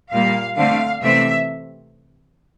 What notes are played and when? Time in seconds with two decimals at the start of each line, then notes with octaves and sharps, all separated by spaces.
0.12 A#2 G3 A#3 F5
0.56 D3 A3 C4 F5
1.02 C3 E3 A3 C4 E5